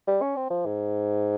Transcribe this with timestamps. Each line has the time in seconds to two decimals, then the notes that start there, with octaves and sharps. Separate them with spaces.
0.07 G3
0.22 C#4
0.36 C4
0.50 F3
0.66 G#2